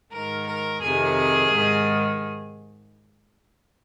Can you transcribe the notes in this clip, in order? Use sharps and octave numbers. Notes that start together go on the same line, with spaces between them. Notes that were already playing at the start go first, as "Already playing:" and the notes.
G#2 D#3 A#4
A#4
F2 C3 D#3 G#4
G#2 D#3